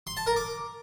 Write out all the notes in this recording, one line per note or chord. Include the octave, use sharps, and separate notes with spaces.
C6
A5
A#4
D6